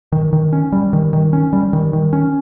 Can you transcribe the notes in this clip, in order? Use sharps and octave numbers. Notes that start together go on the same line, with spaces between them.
D#3
D#3
C#4
G3
D#3
D#3
C#4
G3
D#3
D#3
C#4